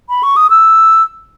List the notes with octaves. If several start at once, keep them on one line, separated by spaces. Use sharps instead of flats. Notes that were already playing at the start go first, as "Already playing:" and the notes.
B5
C#6
D#6
E6